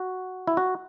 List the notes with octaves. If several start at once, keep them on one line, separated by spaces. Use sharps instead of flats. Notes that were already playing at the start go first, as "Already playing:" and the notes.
Already playing: F#4
E4
F#4